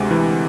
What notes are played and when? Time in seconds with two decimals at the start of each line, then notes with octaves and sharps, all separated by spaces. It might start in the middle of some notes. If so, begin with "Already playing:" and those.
Already playing: D2 C3 G#3
0.11 E3